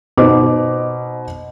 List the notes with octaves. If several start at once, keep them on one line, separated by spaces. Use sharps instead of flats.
B2 D#4 C5 D6